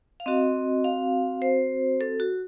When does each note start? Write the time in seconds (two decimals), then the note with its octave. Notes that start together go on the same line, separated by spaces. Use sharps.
0.20 F5
0.26 C4 F#4 D#5
0.84 F5
1.42 C5
2.01 A4
2.20 F#4